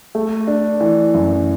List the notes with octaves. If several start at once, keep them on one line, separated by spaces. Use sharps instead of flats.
A3
D4
E3
F#2